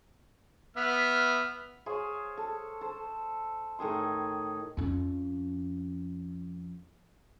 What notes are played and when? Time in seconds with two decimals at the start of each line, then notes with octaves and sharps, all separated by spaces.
0.76 B3 E5 F6
1.86 G#4 C5 C#5 F5
2.37 A4
2.81 A4 C5
3.79 A2 D#3 G#4 C6
4.77 F2 C#4